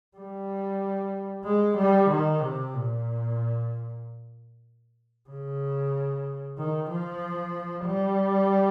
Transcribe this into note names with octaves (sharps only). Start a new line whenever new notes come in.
G3
G#3
G3
D#3
C3
A#2
C#3
D#3
F3
G3